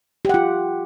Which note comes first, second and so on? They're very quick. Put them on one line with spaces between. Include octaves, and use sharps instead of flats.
G4 F#5 F4